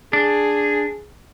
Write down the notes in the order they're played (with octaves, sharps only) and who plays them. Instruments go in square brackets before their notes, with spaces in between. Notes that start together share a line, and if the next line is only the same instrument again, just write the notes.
[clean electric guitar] D4 [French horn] G#4